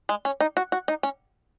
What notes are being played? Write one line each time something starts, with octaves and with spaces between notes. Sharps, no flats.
G#3
C#4
D#4
F#4
F#4
D#4
C#4